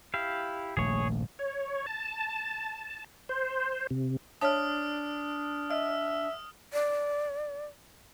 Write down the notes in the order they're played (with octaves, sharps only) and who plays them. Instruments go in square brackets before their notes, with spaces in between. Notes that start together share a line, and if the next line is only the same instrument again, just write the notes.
[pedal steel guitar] E4 G4 F5
[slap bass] D#1 A#1 A3 [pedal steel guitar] G#4 C#5
[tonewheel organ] C#5
A5
C5
C3
[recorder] D4 [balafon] C#5 E5 A5 [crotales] D#6 F6
[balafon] D#5 [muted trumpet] E5 [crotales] F6
[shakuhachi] D5